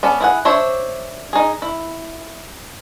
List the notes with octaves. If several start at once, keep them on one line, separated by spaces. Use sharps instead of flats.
B3 C#4 D5 A5
E4 G#4 F#5
D4 C5 C#5 E5
D#4 G#4
E4